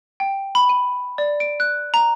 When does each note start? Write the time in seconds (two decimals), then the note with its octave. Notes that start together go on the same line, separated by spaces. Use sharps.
0.20 G5
0.55 B5
0.69 D#7
1.18 D5
1.40 D7
1.60 F#6
1.94 A#5